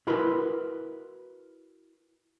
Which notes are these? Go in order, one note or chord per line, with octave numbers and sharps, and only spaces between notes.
E4 F#4 A#4 B4 B5 C6